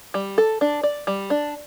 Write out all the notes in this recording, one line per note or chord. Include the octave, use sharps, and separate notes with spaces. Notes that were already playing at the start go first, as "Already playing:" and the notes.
G3
A4
D4
D5
G3
D4